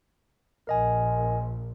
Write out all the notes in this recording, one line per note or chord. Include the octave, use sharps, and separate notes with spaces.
A#1 A#4 D#5 G#5